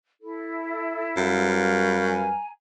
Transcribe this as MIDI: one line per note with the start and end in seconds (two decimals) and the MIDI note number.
0.21 1.61 64
0.21 1.61 69
1.17 2.32 42
1.17 2.38 55
1.17 2.38 71
1.17 2.38 77
2.05 2.48 80
2.05 2.48 82